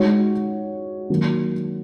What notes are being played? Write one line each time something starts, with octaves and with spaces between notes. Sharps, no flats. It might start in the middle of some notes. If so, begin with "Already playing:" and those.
Already playing: G#3 D#4 F#4 C#5
D#3 F#3 A#3